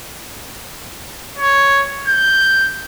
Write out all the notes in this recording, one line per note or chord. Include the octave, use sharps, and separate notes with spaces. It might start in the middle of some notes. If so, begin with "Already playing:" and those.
C#5
G6